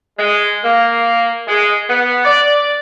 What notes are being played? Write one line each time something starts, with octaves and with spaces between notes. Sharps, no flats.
G#3
A#3
G#3
B3
D5